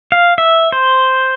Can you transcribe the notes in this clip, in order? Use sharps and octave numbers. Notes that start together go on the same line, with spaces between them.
F5
E5
C5